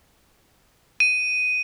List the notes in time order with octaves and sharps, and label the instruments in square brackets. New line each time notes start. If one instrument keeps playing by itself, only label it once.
[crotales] D#7